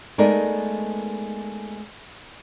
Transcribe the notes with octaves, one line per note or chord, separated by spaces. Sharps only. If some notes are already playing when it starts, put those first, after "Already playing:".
G#3 A3 B3 D#4 A#4 D5